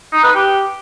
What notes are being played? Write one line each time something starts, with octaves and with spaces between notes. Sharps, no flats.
D#4
B4
G4